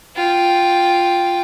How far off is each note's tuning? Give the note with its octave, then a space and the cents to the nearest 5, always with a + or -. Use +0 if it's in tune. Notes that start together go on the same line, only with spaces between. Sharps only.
F4 +0 G5 +0